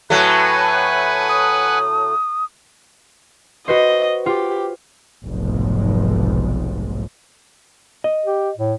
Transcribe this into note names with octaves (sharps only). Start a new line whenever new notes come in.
A2 F#3 A3 B4 F#5 G#5
D#6
F#4 B4 C5 D#5
F4 G4
F1 B1 G#2
D#5
G4
A2